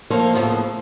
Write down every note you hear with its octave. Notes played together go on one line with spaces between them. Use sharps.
F3 A3 A#3 C5 C#5 F5
A2 C#3 F3 A#3 B3